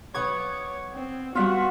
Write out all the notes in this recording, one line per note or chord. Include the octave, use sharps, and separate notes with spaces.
B1 B3 C#5 D6 G#6
C4
G3 B3 F4 F#4 E5 F#5